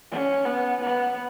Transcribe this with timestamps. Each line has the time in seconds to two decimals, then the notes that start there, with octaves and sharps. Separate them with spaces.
0.11 C#4
0.46 B3
0.81 B3